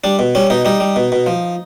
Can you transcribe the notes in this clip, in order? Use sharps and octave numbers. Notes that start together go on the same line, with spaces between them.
G3 D4
B2
G3 C#4
B2 D#4
G3 D#4
G3
B2
B2
F3